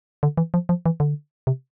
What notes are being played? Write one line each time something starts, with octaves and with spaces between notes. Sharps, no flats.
D3
E3
F3
F3
E3
D3
C3